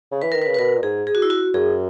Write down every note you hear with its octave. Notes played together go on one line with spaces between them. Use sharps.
C#3
E3 B4
D#3 A#4
B4
C#3
B4
B2 A#4
A#2
G#2 G#4
G#4
F#4
E4
F#4
F#2 G#4